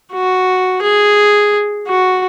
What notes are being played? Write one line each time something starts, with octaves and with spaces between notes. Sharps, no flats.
F#4
G#4
F#4